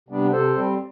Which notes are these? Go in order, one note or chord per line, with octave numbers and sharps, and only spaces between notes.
C3 G3 B3 D4
C3 A4 C5
G3 C4